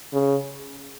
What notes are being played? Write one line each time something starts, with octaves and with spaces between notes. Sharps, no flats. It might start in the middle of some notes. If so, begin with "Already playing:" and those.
C#3